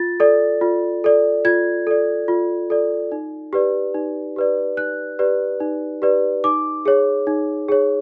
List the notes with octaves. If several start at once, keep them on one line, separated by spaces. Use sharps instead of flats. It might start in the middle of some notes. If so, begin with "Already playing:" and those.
Already playing: F4 A6
A4 D5
F4
A4 D5
F4 G#6
A4 D5
F4
A4 D5
D#4
G4 B4 D5
D#4
G4 B4 D5
D#4 F#6
G4 B4 D5
D#4
G4 B4 D5
D#4 D6
G#4 C#5
D#4
G#4 C#5